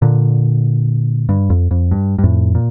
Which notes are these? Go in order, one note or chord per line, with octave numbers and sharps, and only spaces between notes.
A#2 D3
G2
F2
F2
G2
G2
F2 A2
A#2